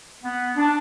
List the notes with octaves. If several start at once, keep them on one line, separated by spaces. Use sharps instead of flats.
B3
D4